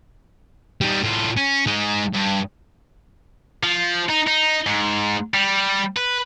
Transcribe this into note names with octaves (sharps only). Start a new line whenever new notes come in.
G3 D#4
A2 F4
C#4
G#3 D#4
G2
F3
D#4
D#4
G#2
G3
B4